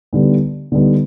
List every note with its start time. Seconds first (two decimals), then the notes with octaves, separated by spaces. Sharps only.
0.13 D3 G3 B3 D#4
0.72 D3 G3 B3 D#4